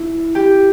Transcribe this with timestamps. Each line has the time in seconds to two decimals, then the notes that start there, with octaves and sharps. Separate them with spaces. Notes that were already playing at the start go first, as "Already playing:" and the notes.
Already playing: E4
0.35 G4